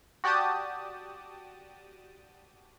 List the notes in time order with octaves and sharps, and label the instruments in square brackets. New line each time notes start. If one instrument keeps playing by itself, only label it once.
[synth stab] F#4 G4 D5 G5 A5 D#6